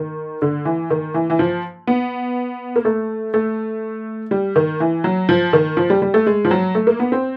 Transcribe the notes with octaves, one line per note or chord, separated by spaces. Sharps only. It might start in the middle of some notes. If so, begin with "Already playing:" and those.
Already playing: D#3
D3
E3
D#3
E3
E3
F3
B3
A#3
A3
A3
G3
D#3
E3
F#3
F3
D#3
F3
G3
G3
A3
G#3
F3
F#3
A3
A#3
B3
C4